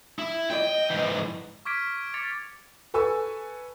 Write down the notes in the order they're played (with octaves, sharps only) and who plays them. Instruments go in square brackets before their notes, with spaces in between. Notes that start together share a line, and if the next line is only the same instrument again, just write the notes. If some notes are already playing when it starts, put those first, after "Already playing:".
[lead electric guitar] E4
[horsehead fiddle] D#5 [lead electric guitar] G5
[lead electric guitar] G#2 E3
[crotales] C#6 D6 F6 G#6 B6 D7
C#6 D6 A6 C#7 F7
[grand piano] A4 B4 G#5 C#6 E6